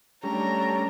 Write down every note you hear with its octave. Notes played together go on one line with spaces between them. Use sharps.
G3 A3 C#4 D4 A#5